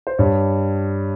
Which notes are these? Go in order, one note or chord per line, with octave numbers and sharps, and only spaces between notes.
C5
G2 G3 C#5